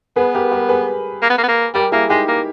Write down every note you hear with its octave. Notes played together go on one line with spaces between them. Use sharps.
B3 G#4 B4
G4 A#4
G4 A#4
G#4 B4
A#3
B3
A#3
B3
A#3
G3 G4 A#4
A#3 E4 G#4
G#3 D#4 G4
A#3